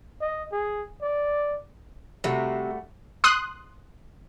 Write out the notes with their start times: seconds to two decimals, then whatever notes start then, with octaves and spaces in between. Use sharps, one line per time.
0.21 D#5
0.52 G#4
1.02 D5
2.24 C3 G3 A3 F#4
3.24 C6 D#6 F#6